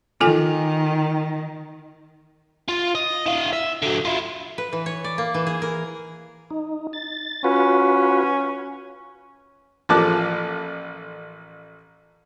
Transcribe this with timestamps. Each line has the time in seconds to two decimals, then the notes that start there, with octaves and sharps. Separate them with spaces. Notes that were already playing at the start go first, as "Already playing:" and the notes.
0.21 D#3 F4 A4 G#5
2.69 F4
2.95 D#5
3.26 E4 F5
3.53 E5
3.82 D3 F#3
4.05 E4 F4
4.58 B4
4.73 E3
4.86 C#5
5.04 D5
5.18 A#3
5.34 E3
5.47 G#4
5.62 A#4
6.50 D#4
6.93 A6
7.44 C#4 F4 F#4 B4
9.89 A1 F3 A#3 A5 D6 F#6